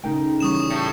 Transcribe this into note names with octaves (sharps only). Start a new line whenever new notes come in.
C#3 A3 D#4 A#4 G5
E3 G3 C#4 C#6 D#6 E7
A2 C#7